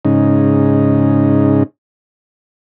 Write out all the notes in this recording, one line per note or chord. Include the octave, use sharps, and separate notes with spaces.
G#2 C#3 D#4